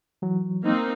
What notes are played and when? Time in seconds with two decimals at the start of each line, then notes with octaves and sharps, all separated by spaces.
0.22 E3 F#3
0.64 A#3 C4 D#4